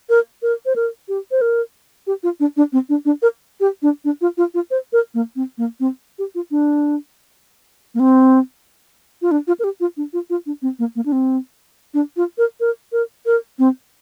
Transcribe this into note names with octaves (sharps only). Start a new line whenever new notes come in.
A#4
A#4
C5
A#4
G4
C5
A#4
G4
F4
D4
D4
C4
D4
D4
A#4
G4
D4
D4
F4
F4
F4
C5
A#4
A#3
C4
A#3
C4
G4
F4
D4
A#3
C4
F4
D4
F4
A#4
G4
F4
D4
F4
F4
D4
C4
A#3
A#3
D4
C4
D4
F4
A#4
A#4
A#4
A#4
C4